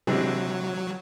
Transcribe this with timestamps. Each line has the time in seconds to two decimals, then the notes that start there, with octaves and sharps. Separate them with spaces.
0.07 C3 E3 F#3 G#3 D4